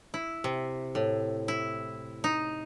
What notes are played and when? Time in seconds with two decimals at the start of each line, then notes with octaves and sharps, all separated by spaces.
0.14 E4
0.44 C3
0.95 A2
1.48 E4
2.24 D#4